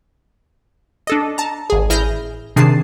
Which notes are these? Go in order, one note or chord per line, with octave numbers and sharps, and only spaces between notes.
D4 A4 D#5
A5 A#5
G#1 G#4
A1 E4 G#4 F6 G6 A#6
C3 D#3 D4 G#4 A5 C7